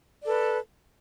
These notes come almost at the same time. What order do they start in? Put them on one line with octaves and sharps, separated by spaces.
D5 A4 B4